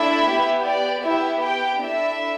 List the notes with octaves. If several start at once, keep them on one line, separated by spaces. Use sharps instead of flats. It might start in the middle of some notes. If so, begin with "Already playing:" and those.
Already playing: A3 D4 E4 E5
B3 G4
D5
B3 E4 G4 E5
G4 G5
D4 E4 A4 E5